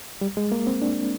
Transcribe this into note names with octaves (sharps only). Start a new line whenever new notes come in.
G3
G#3
A#3
C4
D4